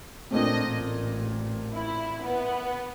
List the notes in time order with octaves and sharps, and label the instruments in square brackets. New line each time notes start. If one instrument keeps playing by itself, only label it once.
[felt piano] A#2 A3 C4 [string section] D4 D#5
[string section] A1
E4
B3